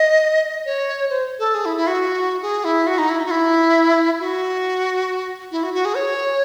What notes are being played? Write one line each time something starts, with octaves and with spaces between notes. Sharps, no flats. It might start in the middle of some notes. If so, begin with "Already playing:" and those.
Already playing: D#5
C#5
C5
A4
G#4
E4
E4
F#4
G#4
E4
F#4
D#4
E4
D#4
F#4
E4
F#4
E4
F#4
F#4
G#4
C#5